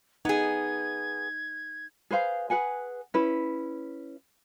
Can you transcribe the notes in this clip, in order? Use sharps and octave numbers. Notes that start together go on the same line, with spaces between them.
B3 D#4 G#4 G#6
G#4 B4 C5 F5
G#4 B4 F#5 G#5
C#4 E4 B4